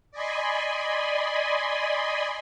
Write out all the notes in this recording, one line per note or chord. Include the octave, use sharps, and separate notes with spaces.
D5 D#5 G#5 B5 C6